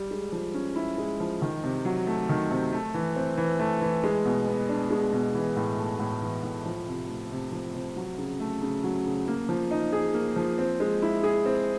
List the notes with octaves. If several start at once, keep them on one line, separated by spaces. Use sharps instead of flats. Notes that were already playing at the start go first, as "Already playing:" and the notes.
Already playing: G3
G#3
F3
C#4
E4
G#3
F3
D#3
C3
F#3
A3
D#3
C3
A3
E3
C4
E3
A3
E3
G#3
B2
B3
D4
G#3
B2
E3
A2
A3
A2
E3
A2
F3
C3
A3
C3
F3
C3
F#3
C#3
A3
C#3
F#3
C#3
A#3
F3
D#4
G#4
A#3
F3
C4
G#3
E4
G#4
C4